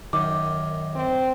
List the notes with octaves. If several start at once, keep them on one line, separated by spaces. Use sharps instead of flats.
F#2 D#3 D6
C4